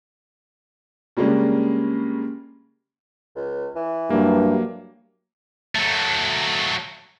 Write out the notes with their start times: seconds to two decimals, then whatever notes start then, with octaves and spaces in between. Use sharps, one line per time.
1.17 C#3 G3 G#3 A#3 C#4 D4
3.36 C#2
3.75 E3
4.10 G2 F#3 A#3 G4
5.75 F#3 A3